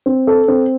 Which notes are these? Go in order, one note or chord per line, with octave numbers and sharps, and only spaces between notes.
C4
A4
C4